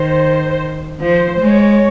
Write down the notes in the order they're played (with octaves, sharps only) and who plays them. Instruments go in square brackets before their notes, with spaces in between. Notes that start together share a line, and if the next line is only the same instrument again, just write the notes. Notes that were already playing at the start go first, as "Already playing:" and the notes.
Already playing: [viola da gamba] D#3 [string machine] C5
[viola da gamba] F3 [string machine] C5
[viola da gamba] G#3 [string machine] C#5